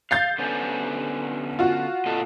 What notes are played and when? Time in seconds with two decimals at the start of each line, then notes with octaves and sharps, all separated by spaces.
0.11 F5 G6 A6 C7
0.38 D3 B3 C#4
1.59 F4 F#4
2.06 A#2 A4 D#5